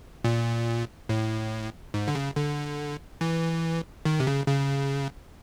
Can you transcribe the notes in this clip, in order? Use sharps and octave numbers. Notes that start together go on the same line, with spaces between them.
A#2
A2
G#2
D3
C#3
D3
E3
D#3
C3
C#3
C#3